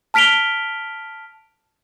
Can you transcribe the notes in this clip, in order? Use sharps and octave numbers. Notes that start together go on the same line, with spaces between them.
A5 F6 B6 D7 F7 G7